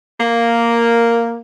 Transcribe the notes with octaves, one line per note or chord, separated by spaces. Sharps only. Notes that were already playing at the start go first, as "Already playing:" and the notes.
A#3